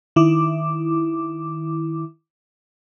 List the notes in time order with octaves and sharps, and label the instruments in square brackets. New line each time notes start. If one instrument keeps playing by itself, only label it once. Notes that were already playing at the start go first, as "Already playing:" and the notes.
[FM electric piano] D#3 E4 D6